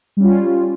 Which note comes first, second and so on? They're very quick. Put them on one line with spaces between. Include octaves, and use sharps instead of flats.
G3 C#4 F4